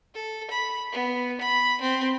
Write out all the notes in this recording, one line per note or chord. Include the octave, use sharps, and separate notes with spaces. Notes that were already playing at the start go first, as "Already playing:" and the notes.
A4
B5
B3
B5
C4